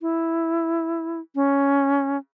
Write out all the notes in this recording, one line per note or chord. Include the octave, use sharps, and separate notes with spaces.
E4
C#4